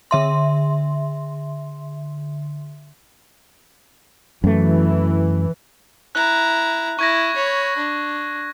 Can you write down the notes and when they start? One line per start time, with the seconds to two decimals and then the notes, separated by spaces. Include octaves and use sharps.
0.11 D3 E5 C6
4.44 F#2 E3 A3
6.15 E4 A#5 F#6
6.99 E4 C#6 G#6 A#6
7.34 C#5 B5
7.77 D4